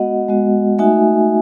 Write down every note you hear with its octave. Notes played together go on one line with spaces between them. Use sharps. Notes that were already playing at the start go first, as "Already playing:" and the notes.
Already playing: G#3 B3 F#4 D#5 F#5
G#3 B3 F#4
A3 D#4 F#4 E5 G#5